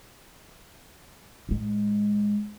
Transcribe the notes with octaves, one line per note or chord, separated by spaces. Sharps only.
A2 G#3